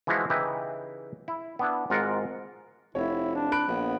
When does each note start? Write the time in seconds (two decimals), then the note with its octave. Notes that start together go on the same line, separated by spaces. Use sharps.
0.07 E3 F3 G#3 E4 F#4 F5
0.30 C#3 E3 D#4 E4 G4 B4
1.28 E4
1.59 B3 D4 E4
1.90 G#1 G#2 F4 A#4 F#5
2.95 F1 E4 C#5
3.35 D4
3.52 B5 F#6 D7
3.68 A#1 B3
3.84 B3